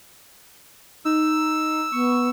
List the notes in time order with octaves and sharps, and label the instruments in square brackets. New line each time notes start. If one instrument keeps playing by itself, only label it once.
[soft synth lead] D#4 [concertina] E6
[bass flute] B3 [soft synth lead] C#6